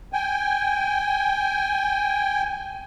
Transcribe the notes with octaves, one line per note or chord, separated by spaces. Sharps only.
G5 G#5